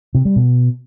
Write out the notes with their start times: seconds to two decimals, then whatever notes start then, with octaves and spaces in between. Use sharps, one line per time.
0.15 C3
0.25 G3
0.36 B2